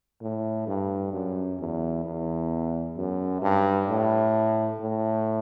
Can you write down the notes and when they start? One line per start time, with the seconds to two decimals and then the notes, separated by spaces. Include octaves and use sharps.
0.22 A2
0.67 G2
1.13 F#2
1.59 E2
2.05 E2
2.97 F#2
3.42 G2
3.88 A2
4.80 A2